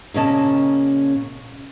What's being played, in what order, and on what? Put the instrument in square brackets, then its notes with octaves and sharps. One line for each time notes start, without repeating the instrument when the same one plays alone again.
[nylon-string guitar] A#2 C#3 A#3 C#4 D#5 A5